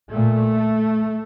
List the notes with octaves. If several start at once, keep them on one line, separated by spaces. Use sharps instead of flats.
A#2 A3